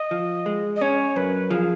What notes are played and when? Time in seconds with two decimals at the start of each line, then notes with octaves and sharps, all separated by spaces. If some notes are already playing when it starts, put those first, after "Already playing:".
Already playing: D#5
0.11 F3
0.46 G#3
0.76 D#5
0.81 C#4 C#5
1.16 F#2 B4
1.50 F3 G#4